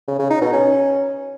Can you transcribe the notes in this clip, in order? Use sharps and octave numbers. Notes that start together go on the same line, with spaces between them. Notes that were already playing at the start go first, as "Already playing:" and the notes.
C#3
C#3
D#4
B2
C#4